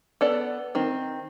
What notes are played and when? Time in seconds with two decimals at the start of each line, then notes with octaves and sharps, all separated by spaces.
0.21 B3 A4 D5
0.75 D#3 C4